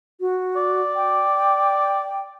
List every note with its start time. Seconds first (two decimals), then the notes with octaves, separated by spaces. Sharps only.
0.20 F#4
0.57 D5
0.95 G5